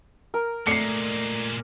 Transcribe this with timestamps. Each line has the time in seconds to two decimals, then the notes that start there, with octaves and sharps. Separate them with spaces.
0.34 A#4
0.67 A#2 G#3 A3 D5 C7 C#7